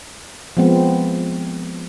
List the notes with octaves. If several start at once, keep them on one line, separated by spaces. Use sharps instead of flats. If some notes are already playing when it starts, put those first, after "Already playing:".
F3 G#3 B3 C4